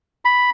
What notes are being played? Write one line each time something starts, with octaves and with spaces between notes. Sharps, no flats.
B5